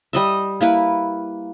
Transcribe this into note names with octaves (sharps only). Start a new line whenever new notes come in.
G3 D#5 E5
A#3 E4 B4